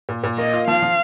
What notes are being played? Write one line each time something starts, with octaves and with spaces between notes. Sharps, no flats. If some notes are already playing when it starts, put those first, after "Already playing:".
A#2
A#2
A#3 D#5
F4
F3 F5
F3